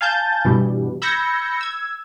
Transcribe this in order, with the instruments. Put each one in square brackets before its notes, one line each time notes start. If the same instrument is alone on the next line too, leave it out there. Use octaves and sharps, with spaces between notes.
[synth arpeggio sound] F5 G#5 A5 G6 A6
G2 B2 E3 G3
B5 E6 G6 G#6 A#6 C#7
E6 G#6